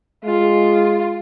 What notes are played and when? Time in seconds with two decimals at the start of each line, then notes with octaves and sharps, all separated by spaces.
0.25 G#3 F4